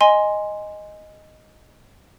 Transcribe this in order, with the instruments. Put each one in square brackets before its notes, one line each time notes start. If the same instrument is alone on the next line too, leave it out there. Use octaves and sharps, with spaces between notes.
[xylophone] D#5 G#5 C6